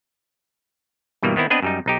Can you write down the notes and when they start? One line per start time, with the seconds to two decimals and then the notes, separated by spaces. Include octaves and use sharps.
1.23 G2 B2 E3 G3 A#3
1.36 D#3 B3 C4 E4
1.50 B3 C4 D4 B4 D#5
1.62 F#2 G3 D#4
1.86 B1 D#4 G4